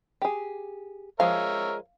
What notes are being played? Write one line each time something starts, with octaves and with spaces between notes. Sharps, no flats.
G4 G#4
F3 G#3 A#4 C#5 E5 F5